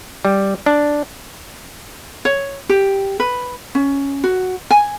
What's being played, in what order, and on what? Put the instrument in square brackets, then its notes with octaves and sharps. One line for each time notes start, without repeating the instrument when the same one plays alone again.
[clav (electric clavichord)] G3
D4
[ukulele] C#5
G4
B4
C#4
F#4
G#5